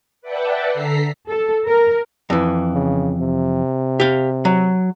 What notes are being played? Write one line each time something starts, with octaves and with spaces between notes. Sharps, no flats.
B4 D5 E5 F#5 G5 A5
D3 A4 A#5 B6 C7
A4
A#4
F2 E3
C#3
C3
G4 F5
F#3